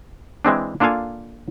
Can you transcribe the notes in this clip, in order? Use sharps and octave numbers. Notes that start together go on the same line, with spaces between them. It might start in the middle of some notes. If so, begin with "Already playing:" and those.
E3 G#3 C4 D4
A#3 D4 F4 A4 F5 G#5